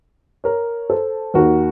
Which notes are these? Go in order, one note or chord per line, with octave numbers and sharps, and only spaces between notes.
A#4 C#5
A4 C5
D#2 D#3 A#3 F#4 A#4